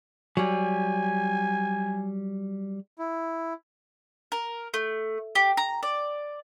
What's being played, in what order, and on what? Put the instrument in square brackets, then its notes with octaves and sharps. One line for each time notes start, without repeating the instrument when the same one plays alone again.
[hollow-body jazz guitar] F#3 G3 [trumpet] G#5
[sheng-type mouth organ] E4
[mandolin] A#4
A3
G4
A#5
D5